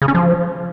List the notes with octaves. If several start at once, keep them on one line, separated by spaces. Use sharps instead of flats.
C#3
C#4
F3